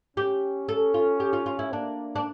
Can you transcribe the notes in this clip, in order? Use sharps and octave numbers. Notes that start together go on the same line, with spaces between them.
C#4 G4
C#4 A4
F4
G4
F4
F4
E4
A#3 D4
D4